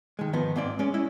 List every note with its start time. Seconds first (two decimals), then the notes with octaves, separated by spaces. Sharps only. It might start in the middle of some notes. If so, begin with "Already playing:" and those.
0.19 D#3 G#3
0.33 G#2 D#3 F3 B3 D#4
0.56 G#2 A#3 C4 D5
0.79 G#3 C#4 D5
0.94 G#3 C#4 E4